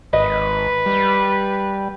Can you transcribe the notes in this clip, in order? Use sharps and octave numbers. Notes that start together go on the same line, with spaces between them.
G#1 B4 D#5
G3